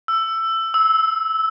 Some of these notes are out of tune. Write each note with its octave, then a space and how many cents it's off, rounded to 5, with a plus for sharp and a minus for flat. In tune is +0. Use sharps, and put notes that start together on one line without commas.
E6 +15
E6 -15